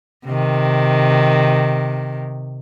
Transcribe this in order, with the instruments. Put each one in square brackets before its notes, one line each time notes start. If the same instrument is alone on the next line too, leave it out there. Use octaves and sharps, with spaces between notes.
[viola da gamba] C3 D#3